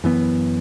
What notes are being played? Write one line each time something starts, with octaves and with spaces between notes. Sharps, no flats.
F#2 E3 B3